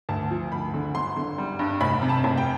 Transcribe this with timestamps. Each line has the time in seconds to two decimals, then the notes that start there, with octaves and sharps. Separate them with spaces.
0.09 D2 A5
0.31 F3
0.52 D2 B5
0.74 D3
0.94 G1 C6
1.16 D3
1.38 G3
1.59 G2
1.81 F1 B5
2.02 C3
2.09 A5
2.24 F1
2.38 G5